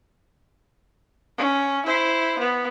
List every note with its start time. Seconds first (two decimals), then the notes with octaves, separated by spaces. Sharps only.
1.38 C#4
1.86 E4 C5
2.39 B3